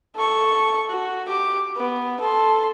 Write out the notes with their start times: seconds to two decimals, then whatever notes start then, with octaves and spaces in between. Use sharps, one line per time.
0.16 A4 C#6
0.90 F#4
1.28 G4 D6
1.77 B3
2.20 A4 C6